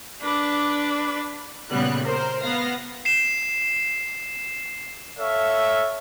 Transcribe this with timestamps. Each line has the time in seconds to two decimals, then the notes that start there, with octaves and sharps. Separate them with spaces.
0.23 D4 B4 D6
1.69 A#2 C#3 G3 B3 F#6
2.03 A#4 C5
2.42 B3 F5 A#6
3.05 C7 E7
5.18 A4 C#5 E5 F5